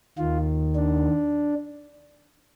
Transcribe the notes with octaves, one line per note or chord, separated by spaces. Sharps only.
D#2 D#3 F4
D4